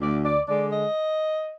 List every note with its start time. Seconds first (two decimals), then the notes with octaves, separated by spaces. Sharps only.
0.01 D2 D5
0.25 D5
0.48 D3 G#3 D5
0.71 D#5